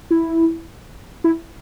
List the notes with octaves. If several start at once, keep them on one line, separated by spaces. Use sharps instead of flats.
E4
E4